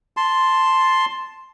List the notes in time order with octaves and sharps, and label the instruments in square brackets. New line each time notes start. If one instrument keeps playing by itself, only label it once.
[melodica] A5 C6